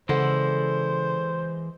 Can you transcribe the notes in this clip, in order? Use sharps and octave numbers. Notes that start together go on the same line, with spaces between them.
C#3 E3 G#3 A4 C5 D5 F#5